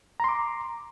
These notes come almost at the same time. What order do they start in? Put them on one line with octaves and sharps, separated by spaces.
A#5 C6 D6